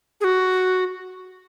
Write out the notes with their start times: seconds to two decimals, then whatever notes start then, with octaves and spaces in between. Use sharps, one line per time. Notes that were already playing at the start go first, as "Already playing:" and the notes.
0.21 G#4
0.24 F#4